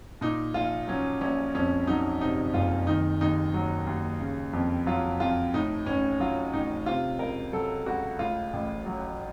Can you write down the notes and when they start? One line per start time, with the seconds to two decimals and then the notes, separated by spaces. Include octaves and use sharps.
0.21 A#2 D#4
0.54 A#1 F4
0.88 F#3 C#4
1.21 A#1 C#4
1.55 F2 C#4
1.87 F#3 D#4
2.21 C3 D#4
2.54 F#1 F4
2.87 D#3 D#4
3.21 D#2 D#4
3.54 F#3
3.87 D#2
4.20 C#3
4.53 F2
4.86 F#3 F4
5.20 F2 F4
5.54 A2 D#4
5.86 A1 C#4
6.20 F#3 F4
6.53 A1 D#4
6.86 C3 F4
7.19 C#2 A#4
7.52 F#3 A4
7.86 C#2 F#4
8.19 A2 F4
8.53 A1
8.86 F#3